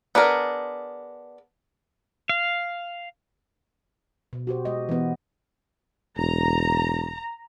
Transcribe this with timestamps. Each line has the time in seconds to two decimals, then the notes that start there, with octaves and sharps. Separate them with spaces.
0.15 B3 D4 G#4 A#4
2.29 F5
4.33 B2
4.47 F#4 G4 C5
4.65 G#3 D#5
4.89 E3 B3
6.17 E1 A#5